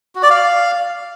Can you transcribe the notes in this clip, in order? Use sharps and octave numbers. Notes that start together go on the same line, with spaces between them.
F#4
D5
F5